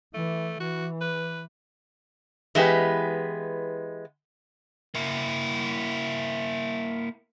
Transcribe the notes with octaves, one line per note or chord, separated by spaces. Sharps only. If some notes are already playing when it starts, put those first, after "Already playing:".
E3 A3
E3 F#4
B4
E3 G#3 B3 G4 B4
A#3 E4